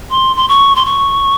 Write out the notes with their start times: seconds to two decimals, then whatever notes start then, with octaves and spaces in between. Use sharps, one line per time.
0.10 C6
0.36 C6
0.49 C#6
0.76 C6
0.85 C#6